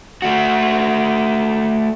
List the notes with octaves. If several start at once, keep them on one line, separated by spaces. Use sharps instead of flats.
A3 F#4